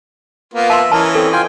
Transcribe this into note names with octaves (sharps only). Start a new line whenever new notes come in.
A#3 B3 F4
E5 A5 C6
E3 C#4 A#4 D#5 A5
C4 A4
F4 G5 G#5